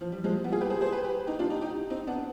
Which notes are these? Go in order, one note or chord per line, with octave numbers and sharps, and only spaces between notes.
F3
G3
F3 G#3
G3 B3
F4 G#4
G4 B4
G#4 C5
G#4 C5
G4 B4
G4 B4
D#4 G4
D4 F4
D#4 G4
D#4 G4
C4 D#4
B3 D4